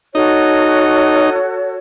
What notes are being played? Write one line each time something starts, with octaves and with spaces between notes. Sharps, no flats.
D#4 F#4 A4 C#5